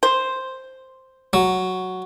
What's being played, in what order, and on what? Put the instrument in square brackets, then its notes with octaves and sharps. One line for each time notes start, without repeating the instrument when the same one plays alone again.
[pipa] C5
[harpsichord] F#3